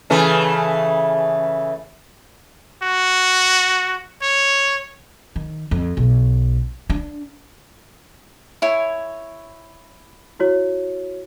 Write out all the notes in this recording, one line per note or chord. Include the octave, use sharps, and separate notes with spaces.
C#3 E3 A3
F#4
C#5
D#3
F2
B1
D4
E4 C#5 G#5
E4 F#4 C#5